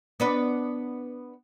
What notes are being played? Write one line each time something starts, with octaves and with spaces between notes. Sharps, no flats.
B3 D4 B4